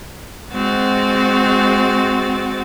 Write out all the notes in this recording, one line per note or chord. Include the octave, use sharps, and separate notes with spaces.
G#3 C4 F#4 A6